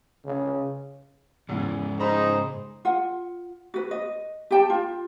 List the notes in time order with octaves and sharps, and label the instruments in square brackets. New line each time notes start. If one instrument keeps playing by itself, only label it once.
[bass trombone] C#3
[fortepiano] E2 E4 [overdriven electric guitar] G#2 C#3
[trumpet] D#4 [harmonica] G#4 C5 [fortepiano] A#5 B5
[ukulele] F4 F#5
F#4 B4
D#5
G4 G5 A5
F4